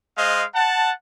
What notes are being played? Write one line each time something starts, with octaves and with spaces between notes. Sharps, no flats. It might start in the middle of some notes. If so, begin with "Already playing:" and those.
G#3 C5 D#5 F5
F#5 A5